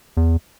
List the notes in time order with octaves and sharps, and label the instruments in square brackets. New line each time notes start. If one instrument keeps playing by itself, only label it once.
[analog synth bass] E2